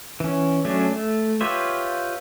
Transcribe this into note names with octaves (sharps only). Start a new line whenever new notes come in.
E3 C#4
F#3 A3 C#4 D4
A3
F4 G4 B4 C#5 E5